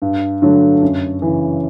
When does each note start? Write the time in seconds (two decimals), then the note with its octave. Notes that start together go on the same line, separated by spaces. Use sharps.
0.02 G2
0.42 D3 F#3 A3
0.82 F#2
1.22 C#3 E3